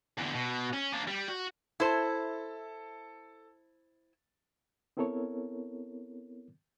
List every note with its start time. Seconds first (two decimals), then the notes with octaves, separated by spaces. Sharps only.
0.18 E2 D3
0.34 B2
0.73 C#4
0.93 A#3 D4
1.07 G3
1.28 F#4
1.80 E4 A4 C5 A5
4.97 B3 C4 E4 A4 A#4 C#5